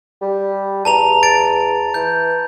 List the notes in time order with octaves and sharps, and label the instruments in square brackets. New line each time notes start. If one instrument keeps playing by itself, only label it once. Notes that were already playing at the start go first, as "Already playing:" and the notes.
[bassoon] G3
[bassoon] E2 [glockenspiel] A5 A#5 F7
[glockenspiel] A6 D7
[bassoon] E3 [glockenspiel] G6